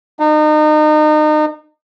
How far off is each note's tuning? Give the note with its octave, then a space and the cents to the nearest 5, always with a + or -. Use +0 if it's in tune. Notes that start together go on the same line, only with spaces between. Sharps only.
D#4 -35